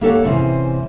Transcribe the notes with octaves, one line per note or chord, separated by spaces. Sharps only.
A#3 G4 A4 C#5 F#5
G#2 C3 E3 C#4 C5